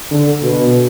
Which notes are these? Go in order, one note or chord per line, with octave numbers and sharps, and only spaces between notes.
D3
B2